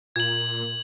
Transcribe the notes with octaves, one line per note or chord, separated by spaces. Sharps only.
A#2 G#6 F#7